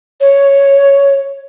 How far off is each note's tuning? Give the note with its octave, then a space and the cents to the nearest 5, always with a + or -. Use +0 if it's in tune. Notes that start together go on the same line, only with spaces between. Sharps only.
C#5 +5